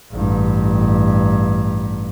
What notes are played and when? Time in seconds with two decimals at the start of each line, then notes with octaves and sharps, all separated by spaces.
0.12 A1 G2